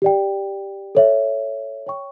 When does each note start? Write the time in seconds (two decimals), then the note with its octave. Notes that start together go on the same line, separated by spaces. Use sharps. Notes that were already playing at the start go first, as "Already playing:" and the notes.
0.02 G4 D5 G5
0.95 A4 C#5 E5
1.87 C#5 G5 C#6